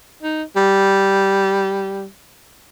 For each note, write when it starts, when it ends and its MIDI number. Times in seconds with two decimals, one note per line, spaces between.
0.23 0.43 63
0.56 2.06 55